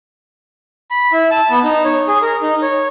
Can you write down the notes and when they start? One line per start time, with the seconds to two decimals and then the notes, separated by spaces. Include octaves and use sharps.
0.91 B5
1.12 E4
1.31 A5
1.50 B3
1.64 D#4
1.84 C#5
2.08 G#4
2.22 A#4
2.42 D#4
2.62 C#5